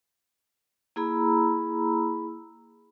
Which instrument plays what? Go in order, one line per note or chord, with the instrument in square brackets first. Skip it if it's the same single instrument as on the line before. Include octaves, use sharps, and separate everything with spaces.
[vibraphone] A#3 E4 G#4 A#5 B5 E6